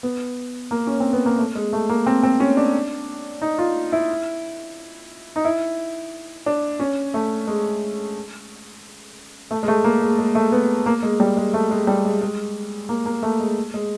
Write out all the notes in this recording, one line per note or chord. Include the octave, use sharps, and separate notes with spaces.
B3
A#3
C#4
C4
B3
A#3
A3
G#3
A3
A#3
C4
C4
C#4
D4
D#4
F4
E4
D#4
E4
D4
C#4
A3
G#3
A3
G#3
A3
A#3
G#3
G#3
A3
B3
A#3
G#3
G3
G#3
A3
G#3
G3
G#3
G#3
A#3
A#3
A3
G#3
G#3